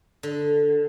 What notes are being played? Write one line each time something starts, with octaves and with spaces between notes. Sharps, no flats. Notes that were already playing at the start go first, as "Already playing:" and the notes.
D3